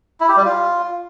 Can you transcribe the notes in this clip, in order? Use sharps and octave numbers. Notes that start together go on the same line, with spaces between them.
E4
G4
G3
F4